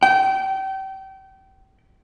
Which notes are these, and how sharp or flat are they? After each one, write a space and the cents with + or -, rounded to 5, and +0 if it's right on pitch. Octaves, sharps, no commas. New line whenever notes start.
G5 -30